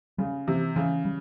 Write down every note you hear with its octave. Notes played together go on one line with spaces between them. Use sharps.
C#3 G3
C3 E3
C#3 E3
G3